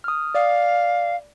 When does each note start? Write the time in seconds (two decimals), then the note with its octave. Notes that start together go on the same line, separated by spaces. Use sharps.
0.04 D#6 F6
0.35 D5 F5